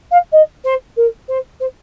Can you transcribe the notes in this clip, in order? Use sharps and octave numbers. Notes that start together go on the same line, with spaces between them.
F5
D#5
C5
A#4
C5
C5